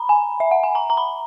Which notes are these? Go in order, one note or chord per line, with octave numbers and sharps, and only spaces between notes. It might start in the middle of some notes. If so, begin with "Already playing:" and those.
Already playing: A#5 B5
G#5
E5
F#5
G#5
A#5
A#5
B5